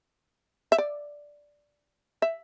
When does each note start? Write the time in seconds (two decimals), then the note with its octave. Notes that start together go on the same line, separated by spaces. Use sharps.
0.72 E5
0.78 D5
2.22 E5